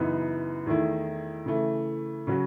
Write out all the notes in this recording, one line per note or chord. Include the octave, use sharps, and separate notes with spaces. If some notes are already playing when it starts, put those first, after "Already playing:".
Already playing: F#2 C#3 E3 B3 D#4
E2 D#3 A3 E4
C#3 E3 A3
C#3 F#3 C#4 F#4